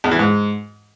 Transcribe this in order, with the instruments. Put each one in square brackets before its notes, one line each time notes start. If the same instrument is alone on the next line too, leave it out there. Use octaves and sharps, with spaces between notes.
[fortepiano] E2
E3
G#2